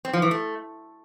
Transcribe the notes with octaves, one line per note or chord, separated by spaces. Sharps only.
C4
F3
E3
A3